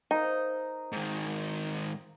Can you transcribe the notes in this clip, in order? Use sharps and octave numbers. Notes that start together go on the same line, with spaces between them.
D#4 A#4 C5 F5
G#2 D#3